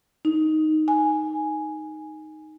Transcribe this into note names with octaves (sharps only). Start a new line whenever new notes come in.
D#4
G#5